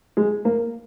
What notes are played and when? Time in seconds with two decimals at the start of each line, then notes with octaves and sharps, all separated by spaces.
0.17 G#3
0.45 A#3